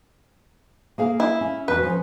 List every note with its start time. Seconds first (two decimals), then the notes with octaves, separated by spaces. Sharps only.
0.98 A#3 G#4 F5
1.20 E4
1.41 C#4
1.68 E2 F#4 B4
1.83 F3 C#4